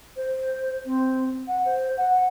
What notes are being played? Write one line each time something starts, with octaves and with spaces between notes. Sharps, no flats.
C5
C4
F#5
C5
F#5